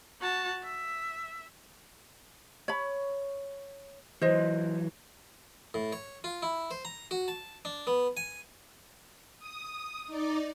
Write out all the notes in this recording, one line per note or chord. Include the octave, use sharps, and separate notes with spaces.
F#4 A5
E5
C#5 B5
E3 F#3 C5 D#5
A2
C#5
F4
E4
C5
A#5
F#4
A5
D4
B3
G#5
D#6
D#4 D5